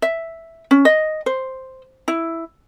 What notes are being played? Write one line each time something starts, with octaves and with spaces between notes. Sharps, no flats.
E5
C#4
D#5
C5
E4